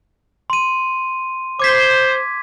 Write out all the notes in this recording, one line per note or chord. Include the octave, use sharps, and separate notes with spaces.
C6 D#7
C5 D6 G#6 B6